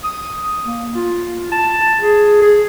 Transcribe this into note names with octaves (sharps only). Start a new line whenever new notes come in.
D#6
A#3
F4
A5
G#4
G#4